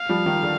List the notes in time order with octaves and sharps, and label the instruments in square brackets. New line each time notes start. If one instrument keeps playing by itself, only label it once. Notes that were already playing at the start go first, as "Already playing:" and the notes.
Already playing: [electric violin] F5
[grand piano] F3 G3
D#3 F3
D3